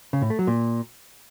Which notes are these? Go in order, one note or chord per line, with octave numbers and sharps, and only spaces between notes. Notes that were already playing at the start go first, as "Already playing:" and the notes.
C#3
A2
A3
F#3
A#2